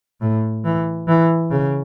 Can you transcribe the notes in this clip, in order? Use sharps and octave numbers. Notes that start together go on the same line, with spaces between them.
A2
E3
E3
C#3